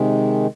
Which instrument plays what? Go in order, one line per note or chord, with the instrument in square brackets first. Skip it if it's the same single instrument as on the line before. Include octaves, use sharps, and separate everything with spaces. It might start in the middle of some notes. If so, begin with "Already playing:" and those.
Already playing: [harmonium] C3 D#3 G#3